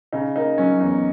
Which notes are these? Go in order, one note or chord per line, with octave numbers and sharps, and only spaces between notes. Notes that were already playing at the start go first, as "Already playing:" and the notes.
C#3 D#4
A#3 D#4
F#3 C#4
E2 D#4